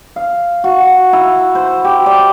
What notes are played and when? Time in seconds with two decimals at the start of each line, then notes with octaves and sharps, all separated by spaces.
0.16 F5
0.64 F#4
1.13 E4
1.55 C5
1.85 G4
2.06 D5